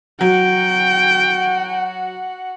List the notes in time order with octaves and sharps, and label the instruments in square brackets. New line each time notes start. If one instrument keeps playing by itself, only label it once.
[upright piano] F#3 [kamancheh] F#4 F#5 [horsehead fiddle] G5